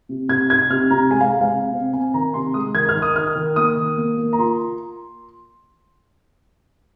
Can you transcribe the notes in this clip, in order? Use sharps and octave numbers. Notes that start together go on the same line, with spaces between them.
C3
C3 G#6
D#4 G#6
C3 F6
C3 A#5
G#3 G#5
F5
G#3
F5
C3
C4
C4 G#5
D#3 A#5
C3 C6
G#3 D#6
D#3 G#6
F6
D#3
D#6
D#4 F6
D#3
A#3 D#6
D#3
A#3
A#3
A#5
F4 C6